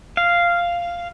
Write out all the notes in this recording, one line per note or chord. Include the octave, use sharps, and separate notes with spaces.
F5